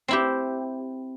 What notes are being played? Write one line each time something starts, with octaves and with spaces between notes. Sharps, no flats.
C4 E4 G4